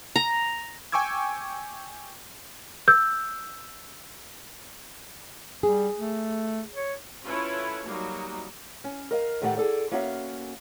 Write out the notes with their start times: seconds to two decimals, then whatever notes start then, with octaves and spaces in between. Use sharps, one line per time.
0.16 A#5
0.92 G5 G#5 C#6 D6 E6 G#6
2.88 E6 G6
5.63 G3 G#4
5.97 A3
6.74 C#5
7.25 C#4 E4 F4 A4 B4 C#5
7.85 F#3 G3 A#3 D#4 F#4
8.84 C#4
9.11 A#4 D#5 F5
9.42 A2 D#3 A3 G4 D#5 F#5
9.57 G#4 A4 D5
9.91 A#3 B3 C#4 F#4 E5 F5